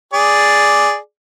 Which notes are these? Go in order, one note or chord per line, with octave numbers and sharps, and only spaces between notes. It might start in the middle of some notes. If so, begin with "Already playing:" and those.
G#4 D5